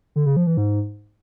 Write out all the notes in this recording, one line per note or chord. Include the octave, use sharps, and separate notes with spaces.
D3
C#3
F3
E3
G#2